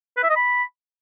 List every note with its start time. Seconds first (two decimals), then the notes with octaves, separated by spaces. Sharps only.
0.17 B4
0.23 E5
0.30 D#5
0.36 B5